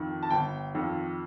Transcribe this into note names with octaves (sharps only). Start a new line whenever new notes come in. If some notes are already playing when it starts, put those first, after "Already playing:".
Already playing: F2 D#3
A5
G1 G5
F2 D#3